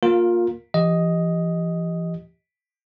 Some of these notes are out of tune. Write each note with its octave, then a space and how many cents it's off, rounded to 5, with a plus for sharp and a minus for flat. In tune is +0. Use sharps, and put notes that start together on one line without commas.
A#3 +0 F4 +20 A#4 +0
E3 +45 G4 +0 D#5 +5